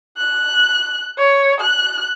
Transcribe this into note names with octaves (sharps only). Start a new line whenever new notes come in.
F#6
C#5
F#6